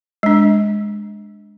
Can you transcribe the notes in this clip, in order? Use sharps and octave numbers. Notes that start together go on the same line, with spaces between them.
G#3 D4